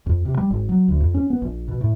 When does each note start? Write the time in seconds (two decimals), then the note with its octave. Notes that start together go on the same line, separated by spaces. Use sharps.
0.06 F2
0.25 C3
0.38 G3
0.50 G#1
0.69 F#3
0.88 D2
1.01 F2
1.14 C#4
1.30 B3
1.42 A#1
1.68 B2
1.81 A2